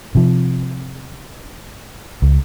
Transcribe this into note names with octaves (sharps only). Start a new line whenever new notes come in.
C3 F3
C#2